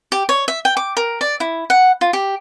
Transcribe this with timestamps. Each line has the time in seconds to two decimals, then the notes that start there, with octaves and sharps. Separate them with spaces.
0.12 G4
0.29 C#5
0.48 E5
0.65 G5
0.77 D6
0.97 A#4
1.21 D5
1.40 E4
1.70 F#5
2.01 F4
2.13 G4